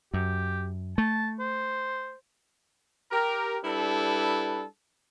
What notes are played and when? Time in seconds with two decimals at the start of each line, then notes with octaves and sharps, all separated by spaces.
0.14 F#2 G4
0.98 A3 A5
1.40 C5
3.12 G4 A#4
3.64 G3 D4 E4 A4 B4